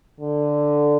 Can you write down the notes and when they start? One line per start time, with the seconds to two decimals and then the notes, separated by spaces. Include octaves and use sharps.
0.20 D3